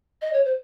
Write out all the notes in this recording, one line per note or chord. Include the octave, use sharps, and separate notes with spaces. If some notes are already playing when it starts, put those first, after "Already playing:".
D#5
C#5
C5